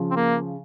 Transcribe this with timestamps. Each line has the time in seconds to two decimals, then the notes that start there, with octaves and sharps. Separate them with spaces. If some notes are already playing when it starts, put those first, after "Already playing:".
Already playing: C#3 F3
0.11 C4
0.16 A#3